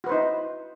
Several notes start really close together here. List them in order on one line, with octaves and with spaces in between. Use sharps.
F#4 B4 C5 D#4 E4